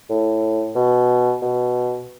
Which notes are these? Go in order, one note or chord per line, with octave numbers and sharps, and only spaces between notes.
A2
B2
B2